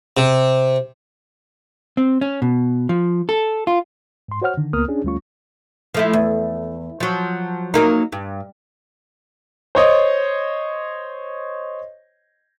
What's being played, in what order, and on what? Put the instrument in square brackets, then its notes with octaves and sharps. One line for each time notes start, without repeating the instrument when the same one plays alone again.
[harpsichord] C3
[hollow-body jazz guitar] C4
C#4
B2
F3
A4
F4
[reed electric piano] G#2 C6
F#4 C5 C#5 F#5 F6
D3 D#3
C#2 A#3 B3 A#4 D#6 F6
C#4 D4 G#4
D2 G3 A3 C#4 F4 C#6
[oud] F3 A3 E4
E2
F3 F#3
F#3 A#3 D#4
G2
[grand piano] C5 C#5 D#5